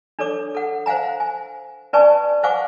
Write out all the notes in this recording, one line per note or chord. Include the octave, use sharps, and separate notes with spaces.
D4 A4 C#5 D6
A4 F#5
C5 F5 F#5 G#5 A#5
G#5
C#4 B4 D5 G#5 A5 C#6
C5 F5 F#5 G#5 C#6 D6